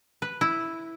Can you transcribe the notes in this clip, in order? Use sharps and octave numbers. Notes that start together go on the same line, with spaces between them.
B4
E4